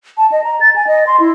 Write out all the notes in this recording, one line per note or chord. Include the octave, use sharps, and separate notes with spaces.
A5
D#5
A#5
A6
G#5
D#5
C6
E4